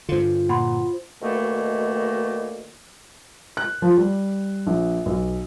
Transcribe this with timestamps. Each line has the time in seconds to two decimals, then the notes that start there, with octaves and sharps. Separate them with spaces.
0.09 G2 D3 F4 C5
0.49 A#2 F#5 B5 C6
1.21 D2 B2 D#3 A3 A#3
3.57 F#6
3.82 F3
3.97 G3
4.67 A#1
5.06 B1